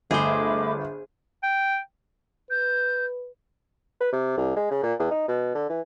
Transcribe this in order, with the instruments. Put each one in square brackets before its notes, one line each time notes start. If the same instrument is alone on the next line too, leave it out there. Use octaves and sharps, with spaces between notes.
[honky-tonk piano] G1 [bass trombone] A3 [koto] G#4 C5 [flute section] D#5 B5 D6
[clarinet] G5
[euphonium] B4 [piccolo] G6
[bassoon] B4
C3
C2
G#3
C#3
A#2
E2
D#4
B2
D3
E3